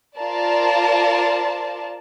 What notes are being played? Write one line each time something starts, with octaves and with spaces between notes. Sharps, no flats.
F4 A#4 C5 D5 A5